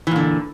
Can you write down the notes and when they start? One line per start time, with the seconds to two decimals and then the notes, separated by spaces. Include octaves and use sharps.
0.07 E3
0.11 A#2
0.16 D3